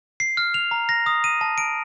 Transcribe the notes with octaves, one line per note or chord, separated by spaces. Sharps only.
C7
F6
F7
A#5
A#6
D#6
D#7
A5
D7